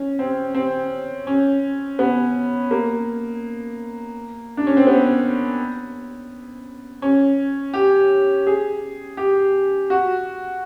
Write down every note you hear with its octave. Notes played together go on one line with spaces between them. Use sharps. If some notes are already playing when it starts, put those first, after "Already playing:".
Already playing: C#4
C4
C4
C#4
B3
A#3
D4
C#4
C4
B3
C#4
G4
G#4
G4
F#4